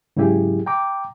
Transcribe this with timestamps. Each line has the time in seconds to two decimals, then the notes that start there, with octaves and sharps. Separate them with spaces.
0.17 G#2 C#3 F#3 E4 G4 G#4
0.66 G5 A#5 D6